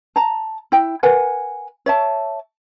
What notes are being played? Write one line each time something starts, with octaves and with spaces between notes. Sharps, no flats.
A5 A#5
E4 G5
A#4 B4 F#5 G#5
C#5 E5 A5